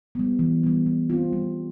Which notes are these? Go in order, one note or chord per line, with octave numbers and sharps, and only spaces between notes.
G3 B3
E3
G3 B3
G3
C4 F4
G3